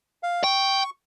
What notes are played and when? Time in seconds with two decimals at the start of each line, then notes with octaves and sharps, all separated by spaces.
0.23 F5
0.44 G5 C#6